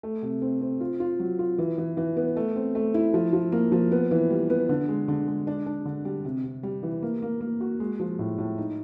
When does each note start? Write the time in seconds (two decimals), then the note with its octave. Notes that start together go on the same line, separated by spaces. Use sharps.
0.03 A3
0.22 C3
0.42 C4
0.61 C4
0.81 F4
1.00 F4
1.20 F#3
1.39 F4
1.58 E3
1.78 E3
1.97 E3
2.17 B3
2.36 A3
2.56 C4
2.75 A3
2.94 E4
3.14 F3
3.33 F3
3.52 A#3
3.72 F3
3.92 B3
4.11 E3
4.30 G3
4.50 B3
4.69 D3
4.89 G#3
5.08 D3
5.27 G#3
5.47 D4
5.66 D4
5.85 D3
6.05 G3
6.25 C3
6.44 C3
6.63 G3
6.83 E3
7.02 A#3
7.22 A#3
7.41 A#3
7.61 F#4
7.80 G#3
8.00 F3
8.19 A2
8.38 A2
8.58 D#4